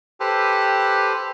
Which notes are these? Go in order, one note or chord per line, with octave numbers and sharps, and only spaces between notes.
G4 A4 B4 C5